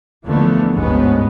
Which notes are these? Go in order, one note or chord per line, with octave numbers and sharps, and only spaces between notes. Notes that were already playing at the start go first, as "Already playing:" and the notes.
D#2 D3 E3 F3 A3 B3
G1 D2 G#2 G#3 B3 C#4